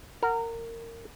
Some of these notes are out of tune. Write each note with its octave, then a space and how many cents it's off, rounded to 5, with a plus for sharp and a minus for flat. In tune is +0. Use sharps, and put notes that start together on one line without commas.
A#4 -20 F#5 +0